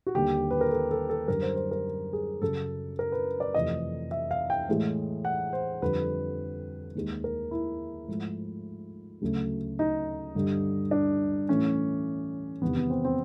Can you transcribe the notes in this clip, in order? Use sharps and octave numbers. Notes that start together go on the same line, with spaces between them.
F#4
D#2 D3 G3 G4
B4
A#4
A4
A4
A4
F#2 D3 G3 A#4
C5
C5
A#4
G#4
F#2 C#3 F#3 A4
A#4
B4
D5
F2 C3 E3 A3 D#5
E5
F5
G5
A2 E3 G#3
F#5
C5
F2 D3 G3 B4
D#2 D#3 G#3
A#4
E4
G#2 F3 A3
D2 C#3 F#3 A3
D#4
G2 D3 G3
D4
A2 E3 A3 C#4
E2 C3 D#3 G3 B3
B3
C4
C4